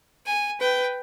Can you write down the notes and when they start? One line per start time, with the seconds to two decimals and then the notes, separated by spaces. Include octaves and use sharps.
0.26 G#5
0.60 B4 G5